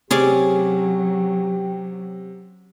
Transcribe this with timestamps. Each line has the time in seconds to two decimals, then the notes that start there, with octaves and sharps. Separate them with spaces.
0.11 C3 F#3 C#4 G4 G#4 D5